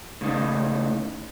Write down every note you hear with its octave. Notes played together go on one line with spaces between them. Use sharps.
A2 C#3 D#4